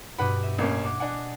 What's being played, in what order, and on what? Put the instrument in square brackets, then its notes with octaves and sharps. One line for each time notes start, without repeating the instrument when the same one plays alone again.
[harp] G2 B2 G4 [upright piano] B4 F#5 B5
[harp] E5
[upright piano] A1 A#3 C#4
[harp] F#5 D6
[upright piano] D4 F#5 [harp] D#5 G#5